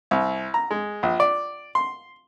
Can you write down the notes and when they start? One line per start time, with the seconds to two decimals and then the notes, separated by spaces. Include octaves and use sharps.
0.11 C2
0.54 A#5
0.71 G#3
1.03 A#1
1.20 D5
1.75 C6